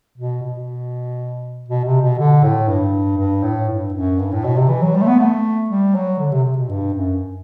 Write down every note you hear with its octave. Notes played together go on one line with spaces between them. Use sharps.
B2
B2
B2
C3
B2
D3
A2
G2
G2
A2
G2
F#2
G2
A2
B2
C3
E3
F#3
G3
A3
B3
A3
G3
F#3
D3
C3
C3
B2
G2
F#2